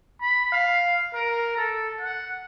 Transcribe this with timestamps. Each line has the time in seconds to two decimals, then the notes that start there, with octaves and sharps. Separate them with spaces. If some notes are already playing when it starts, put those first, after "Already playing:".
0.22 B5
0.52 F5
1.15 A#4
1.57 A4
2.01 F#5